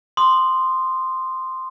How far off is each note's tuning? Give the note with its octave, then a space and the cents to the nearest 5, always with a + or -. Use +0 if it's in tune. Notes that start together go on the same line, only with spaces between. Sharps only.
C6 -5 D#6 -30